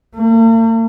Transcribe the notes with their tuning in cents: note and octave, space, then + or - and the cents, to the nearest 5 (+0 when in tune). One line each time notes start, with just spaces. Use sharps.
A#3 -45